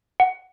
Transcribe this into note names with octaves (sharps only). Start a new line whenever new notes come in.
F#5